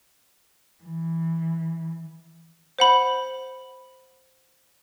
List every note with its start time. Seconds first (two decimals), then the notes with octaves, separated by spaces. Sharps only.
0.84 E3
2.79 C5 F#5 B5